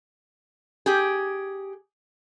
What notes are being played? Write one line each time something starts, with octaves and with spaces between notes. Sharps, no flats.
G4 G#4